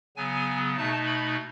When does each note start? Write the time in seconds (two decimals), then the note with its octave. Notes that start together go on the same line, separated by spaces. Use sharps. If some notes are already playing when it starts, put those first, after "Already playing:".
0.17 C#3 F#3 B3 G#5
0.77 B2 A3 D#4 A5
1.06 B5